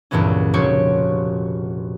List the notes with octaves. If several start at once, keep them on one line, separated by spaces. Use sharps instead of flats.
C#2 G2 A#2 E3 B3 C#4
F1 F#4 G4 C#5 C6 C#6